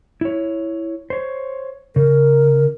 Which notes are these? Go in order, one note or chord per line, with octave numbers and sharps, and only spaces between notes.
E4 C#5
C5 C#5
C#3 A#4